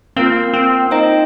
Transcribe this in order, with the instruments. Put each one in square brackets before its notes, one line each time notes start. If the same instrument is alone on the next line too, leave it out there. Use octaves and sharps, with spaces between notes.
[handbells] A#3 F4 A#4 F5 [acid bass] C4
[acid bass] C4
[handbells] D#4 C5 D#5 G5